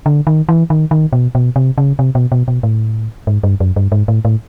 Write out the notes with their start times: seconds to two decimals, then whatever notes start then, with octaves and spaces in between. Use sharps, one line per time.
0.06 D3
0.27 D#3
0.49 E3
0.70 D#3
0.91 D#3
1.13 B2
1.35 B2
1.56 C3
1.78 C#3
1.99 C3
2.15 B2
2.32 B2
2.48 B2
2.63 A2
3.27 G#2
3.44 G2
3.60 F#2
3.76 G2
3.92 G#2
4.08 A2
4.25 A2